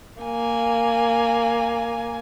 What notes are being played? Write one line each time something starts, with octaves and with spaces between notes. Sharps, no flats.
A#3 G#5